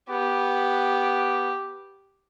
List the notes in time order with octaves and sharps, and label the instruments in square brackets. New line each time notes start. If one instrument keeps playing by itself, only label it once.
[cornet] B3 [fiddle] G4